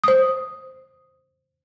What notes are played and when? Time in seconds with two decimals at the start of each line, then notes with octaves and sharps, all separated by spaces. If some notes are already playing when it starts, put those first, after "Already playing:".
0.04 C5 D#6